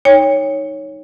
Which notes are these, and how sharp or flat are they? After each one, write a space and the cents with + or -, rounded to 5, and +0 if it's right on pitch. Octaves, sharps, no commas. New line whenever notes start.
D#4 +5 C#5 +0 G5 +40